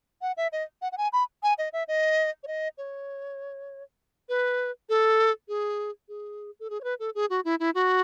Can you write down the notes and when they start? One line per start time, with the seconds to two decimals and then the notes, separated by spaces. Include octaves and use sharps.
0.22 F#5
0.37 E5
0.52 D#5
0.82 F#5
0.92 F#5
0.98 G#5
1.13 B5
1.43 G#5
1.58 D#5
1.73 E5
1.88 D#5
2.43 C#5
2.47 D#5
2.78 C#5
4.29 B4
4.89 A4
5.48 G#4
6.09 G#4
6.60 A4
6.70 G#4
6.81 C#5
6.84 B4
7.00 A4
7.15 G#4
7.30 F#4
7.45 E4
7.60 E4
7.75 F#4